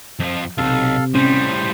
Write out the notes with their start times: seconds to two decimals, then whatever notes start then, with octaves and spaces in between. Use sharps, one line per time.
0.20 F2 F3
0.58 B1 G2 C3 A4 F5
1.15 A2 G3 C#4 C5